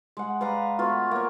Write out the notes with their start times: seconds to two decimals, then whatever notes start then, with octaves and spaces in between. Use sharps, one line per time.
0.17 G#3 F#5
0.41 B4 D5 F5 A#5
0.79 A3 B3 F4 F#4
1.11 A#3 C#5